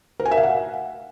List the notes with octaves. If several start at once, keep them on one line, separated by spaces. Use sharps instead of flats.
A#4
G#5
E5
F5
F#5